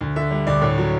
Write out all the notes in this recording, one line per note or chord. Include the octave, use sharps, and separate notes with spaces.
D2
D3 E5
G3
D2 D5
A2 C#5
F#3